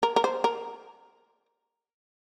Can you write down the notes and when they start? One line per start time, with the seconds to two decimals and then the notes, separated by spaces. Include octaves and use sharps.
0.03 A#4
0.16 A#4
0.24 C5
0.44 A#4